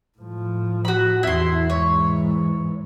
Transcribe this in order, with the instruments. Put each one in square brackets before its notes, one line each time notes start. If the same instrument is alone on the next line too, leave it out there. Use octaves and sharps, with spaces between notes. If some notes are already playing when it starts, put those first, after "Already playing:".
[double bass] A2 F3
[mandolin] F#4 B5
[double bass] E2 [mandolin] E4 C6
[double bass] G#2 E3 [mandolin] C#5